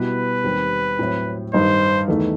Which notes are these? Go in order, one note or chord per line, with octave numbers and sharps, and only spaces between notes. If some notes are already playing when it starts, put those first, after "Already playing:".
Already playing: B2 G3 B3 E4 B4
D#2 D#3 G3 C4
A2 F#3 C4 E4
G2 D#3 G3 D#4 C5
E2 D#3 A3 D#4